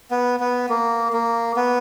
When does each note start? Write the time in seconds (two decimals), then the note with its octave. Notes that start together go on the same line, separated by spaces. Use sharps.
0.11 B3
0.40 B3
0.69 A#3
1.13 A#3
1.57 B3